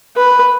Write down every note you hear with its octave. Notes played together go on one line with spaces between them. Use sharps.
B4